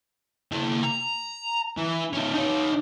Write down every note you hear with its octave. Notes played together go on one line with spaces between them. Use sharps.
A#3 E4
A#5
E3
C#4 D#4
D#4 C#5